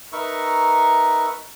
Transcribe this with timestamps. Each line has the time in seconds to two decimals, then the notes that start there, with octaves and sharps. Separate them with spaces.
0.12 D#4 A#4 B4 E5 C#6